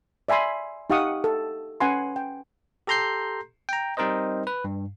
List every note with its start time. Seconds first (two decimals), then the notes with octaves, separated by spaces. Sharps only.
0.29 D5 E5 G#5 B5 C6
0.90 D#4 G4 F5 F#5 C#6 D#6
1.24 A4
1.80 C#4 B4 F#5 G#5 B5 C6
2.16 G5
2.87 G4 A4 A#5 C6 G6 C7
3.69 G5 A#5
3.97 G3 C4 D#4 A#4 C5 D#5
4.47 B4
4.64 G2